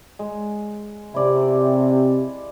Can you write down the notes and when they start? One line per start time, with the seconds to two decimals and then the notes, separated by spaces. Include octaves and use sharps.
0.19 G#3
1.14 C3 E4 D5